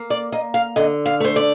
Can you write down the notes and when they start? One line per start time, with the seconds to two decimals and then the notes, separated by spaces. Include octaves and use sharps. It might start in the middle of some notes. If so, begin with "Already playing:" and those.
Already playing: A#3
0.10 D5
0.32 A#3 D#5
0.54 F5
0.76 D3 D#5
1.06 F5
1.20 A3 C5
1.36 D5